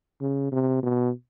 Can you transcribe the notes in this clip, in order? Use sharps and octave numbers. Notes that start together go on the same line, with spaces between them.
C#3
C3
B2